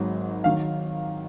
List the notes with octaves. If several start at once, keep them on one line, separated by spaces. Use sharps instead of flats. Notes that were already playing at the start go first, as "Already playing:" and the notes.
Already playing: G#1 G#2 F#3
D#3 F#3 F5